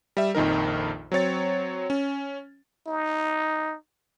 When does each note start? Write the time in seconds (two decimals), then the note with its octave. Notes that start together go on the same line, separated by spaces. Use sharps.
0.17 G3 E5
0.35 A#1 F2 D#3 D#4 A#4
1.12 F#3 C4 C#5 A6
1.90 C#4
2.87 D#4